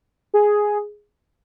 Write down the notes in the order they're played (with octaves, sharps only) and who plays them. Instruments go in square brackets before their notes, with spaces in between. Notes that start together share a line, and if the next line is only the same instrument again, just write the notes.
[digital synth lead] G#4